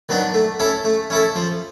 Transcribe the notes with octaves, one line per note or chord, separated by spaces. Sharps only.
D#3 F#3 B3 D4
A3
C#4 E4 A4
A3
C#4 E4 A4
F3